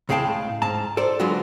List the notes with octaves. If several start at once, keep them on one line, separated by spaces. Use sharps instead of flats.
C#2 A2 G#4 F5 G5 A5
G#2 A5 A#5
A4 C5 D5
D3 F#3 G#3 B3 F4 F#4